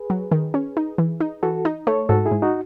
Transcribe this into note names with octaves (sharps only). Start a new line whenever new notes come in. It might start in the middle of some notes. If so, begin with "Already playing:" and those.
Already playing: G#4 B4
F#3
D#3
C#4
D#4
E3
D#4
E3 F#4 A4
D#4
A3 A4 C#5
G#2 F#4 A4
E4 G#4
G#2
D#4 F#4